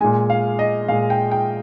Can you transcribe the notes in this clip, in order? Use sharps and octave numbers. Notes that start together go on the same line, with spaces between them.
A#2 G#3 G#5
F5
D#5
A#2 G#3 F5
G5
G5